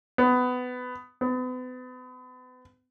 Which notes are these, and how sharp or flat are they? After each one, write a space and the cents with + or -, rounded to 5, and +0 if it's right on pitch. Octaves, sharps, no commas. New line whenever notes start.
B3 +20
B3 +40